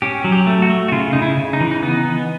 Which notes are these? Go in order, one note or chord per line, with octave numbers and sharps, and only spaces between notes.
C#4 G4
F#3
G4
A3
F#4
A3
F#4
C#3 F4
C#3 D#4
E4
C#3
D#4
E3
D#4
B3 D#4
B3